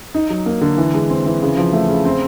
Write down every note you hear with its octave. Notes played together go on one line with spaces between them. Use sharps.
D#4
F#3
A#3
D3
E3
G#3
C4
E3
C#3
F3
A3
C#3
C4